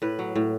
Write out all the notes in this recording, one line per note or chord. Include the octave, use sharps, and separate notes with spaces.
A2 B4
F#3
A2